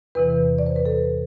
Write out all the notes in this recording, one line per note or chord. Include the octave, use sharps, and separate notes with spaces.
E2 C3 E3 B4
D5
C5
B4
A4